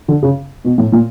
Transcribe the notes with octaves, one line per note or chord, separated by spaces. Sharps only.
D3
C#3
B2
A2
A#2